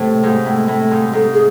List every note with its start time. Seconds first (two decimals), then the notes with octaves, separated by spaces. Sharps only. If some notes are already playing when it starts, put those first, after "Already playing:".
Already playing: A2 C3
0.23 G#2
0.46 A2
0.68 A2
0.91 G#2
1.13 G#2 A4
1.34 G#4